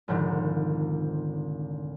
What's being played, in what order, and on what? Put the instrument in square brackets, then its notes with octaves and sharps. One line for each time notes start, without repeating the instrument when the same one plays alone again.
[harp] F1 C2 G#2 D3 D#3 F3